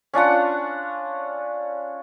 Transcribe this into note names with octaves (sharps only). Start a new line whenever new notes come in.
C#4 D4 F4 F#5